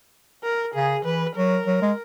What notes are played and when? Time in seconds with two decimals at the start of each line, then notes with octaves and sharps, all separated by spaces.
0.44 A#4
0.74 C#3 G#4
1.05 E3 B4
1.36 F#3 A#4
1.66 F#3
1.82 G#3